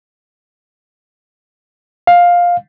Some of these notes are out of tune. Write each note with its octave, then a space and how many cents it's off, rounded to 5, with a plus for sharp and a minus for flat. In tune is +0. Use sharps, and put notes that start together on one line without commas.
F5 +10